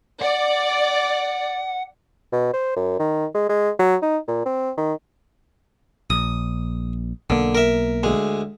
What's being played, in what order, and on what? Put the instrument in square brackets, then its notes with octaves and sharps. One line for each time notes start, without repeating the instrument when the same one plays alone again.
[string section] D5 [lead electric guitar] F#5
[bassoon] B2
C5
F#2
D#3
G#3
G#3
F#3
D#4
A#2
C4
D#3
[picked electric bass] A#1 [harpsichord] D#6
[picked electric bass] B1 A#3 [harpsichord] D3
[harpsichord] A#4 E5
D2 G#3